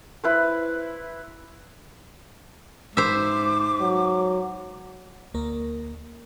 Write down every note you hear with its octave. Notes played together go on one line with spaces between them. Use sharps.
E4 B4 C5
G#2 C5 E5 D6
F#3
D2 A#3 A#4